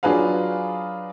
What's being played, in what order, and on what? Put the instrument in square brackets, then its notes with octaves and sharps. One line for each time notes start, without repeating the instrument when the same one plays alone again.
[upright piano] F#3 D4 F4 G#4 B4 F5